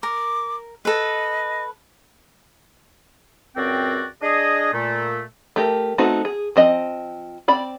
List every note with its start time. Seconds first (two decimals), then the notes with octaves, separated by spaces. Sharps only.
0.03 A#4 D6
0.85 A4 B4 D#5
3.56 C#2 F#2 C4 F#4 D5 G5
4.22 D4 G#4 D#5
4.72 A#2 A3
5.56 A3 G4 A#4
5.98 A3 B3 C4 D#4 F#4
6.25 G#4
6.56 F3 C4 D#5
7.48 C4 D5 B5